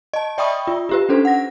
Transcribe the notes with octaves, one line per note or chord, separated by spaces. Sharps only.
D#5 A5
D5 E5 G5 B5 C#6 D#6
F4
F4 G4 B4
C#4 D4 A4 C5
F#5 A#6